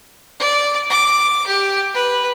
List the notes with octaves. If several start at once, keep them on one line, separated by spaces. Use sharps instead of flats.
D5
D6
G4
B4